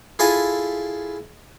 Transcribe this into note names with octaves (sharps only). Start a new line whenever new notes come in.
E4 F4 G#4 A4 G#5 B5